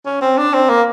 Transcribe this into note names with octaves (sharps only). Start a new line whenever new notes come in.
C#4
C4
D4
C4
A#3